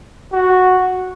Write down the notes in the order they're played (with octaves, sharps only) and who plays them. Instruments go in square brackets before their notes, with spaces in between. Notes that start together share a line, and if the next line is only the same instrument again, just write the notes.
[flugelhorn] F#4